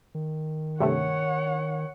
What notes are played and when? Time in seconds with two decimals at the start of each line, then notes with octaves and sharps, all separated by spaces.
0.15 D#3
0.80 G2 C3 A3 C#5 F#5